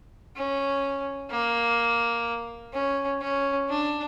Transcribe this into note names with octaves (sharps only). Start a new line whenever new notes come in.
C#4
A#3
C#4
C#4
D4